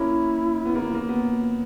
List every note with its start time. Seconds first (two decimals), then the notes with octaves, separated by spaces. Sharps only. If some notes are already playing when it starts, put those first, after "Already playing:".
Already playing: A#3 C#4 E4
0.65 B3
0.75 A#3
0.94 A#3
1.09 B3